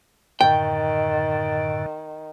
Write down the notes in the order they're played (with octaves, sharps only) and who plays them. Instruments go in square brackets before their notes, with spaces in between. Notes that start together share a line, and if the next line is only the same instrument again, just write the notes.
[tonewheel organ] F#2 A2 D3 [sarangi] D#3 [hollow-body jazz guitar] G5